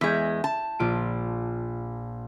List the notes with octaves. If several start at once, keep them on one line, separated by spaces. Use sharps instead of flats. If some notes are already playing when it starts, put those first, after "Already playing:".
E2 G#3 G6 G#6 B6
A5
A#1 F4 D7